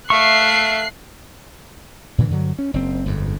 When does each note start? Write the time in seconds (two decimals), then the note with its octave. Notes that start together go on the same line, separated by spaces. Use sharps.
0.10 A3 E5 F5 C#6 F#6 C7
2.18 A#2 D3 E3
2.30 G2 D3 F3 F#3
2.59 C#4
2.74 F#1 C4
3.06 G1 F2 G#2